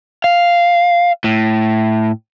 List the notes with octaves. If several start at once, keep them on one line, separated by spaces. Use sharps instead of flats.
F5
A2